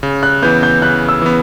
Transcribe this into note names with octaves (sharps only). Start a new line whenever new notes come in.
C#3
F#6
E3 B3 G6
G6
C#3 F#6
E6
E3 B3